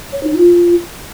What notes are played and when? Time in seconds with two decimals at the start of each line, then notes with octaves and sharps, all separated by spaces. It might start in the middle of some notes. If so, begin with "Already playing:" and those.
0.12 C#5
0.23 D#4
0.34 F4